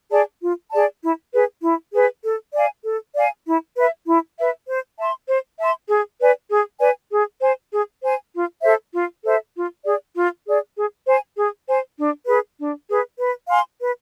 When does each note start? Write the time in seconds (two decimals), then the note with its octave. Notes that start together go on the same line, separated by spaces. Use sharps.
0.11 G#4 D5 A5
0.41 F4
0.71 G#4 D5 A5
1.02 E4
1.32 G#4 B4
1.62 E4
1.93 G#4 B4
2.24 A4
2.54 D5 F5 G#5
2.85 A4
3.14 D5 F5 G#5
3.45 E4
3.75 B4 E5
4.06 E4
4.37 B4 E5
4.68 C5
4.98 E5 A5 C6
5.27 C5
5.59 E5 A5 C6
5.89 G#4
6.20 B4 D5 G#5
6.49 G#4
6.80 B4 D5 G#5
7.11 G#4
7.41 C5 G#5
7.71 G#4
8.02 C5 G#5
8.33 F4
8.62 A4 C5 E5
8.93 F4
9.24 A4 C5 E5
9.54 F4
9.84 G#4 D5
10.15 F4
10.45 G#4 D5
10.75 G#4
11.05 C5 G#5
11.36 G#4
11.67 C5 G#5
11.97 D4
12.27 G#4 B4
12.58 D4
12.88 G#4 B4
13.18 B4
13.49 F5 G#5 C6
13.80 B4